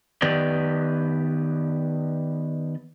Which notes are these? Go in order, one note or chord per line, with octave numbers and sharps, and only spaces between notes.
D#3 B3 G4 B4 D5